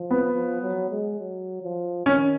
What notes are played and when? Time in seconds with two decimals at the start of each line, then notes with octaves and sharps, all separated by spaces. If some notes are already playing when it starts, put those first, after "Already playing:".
Already playing: F3
0.11 B3
0.33 F3
0.62 F#3
0.91 G#3
1.20 F#3
1.63 F3
2.06 D#3 C#4